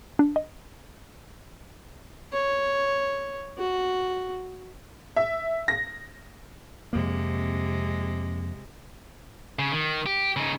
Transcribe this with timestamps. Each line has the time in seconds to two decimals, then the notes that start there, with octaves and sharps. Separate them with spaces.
0.19 D4
0.36 D#5
2.33 C#5
3.58 F#4
5.16 E5
5.68 A#6
6.93 F2 C3 G#3 A#3
9.59 C#3
9.72 D#3
10.06 G4
10.36 C#3 D#4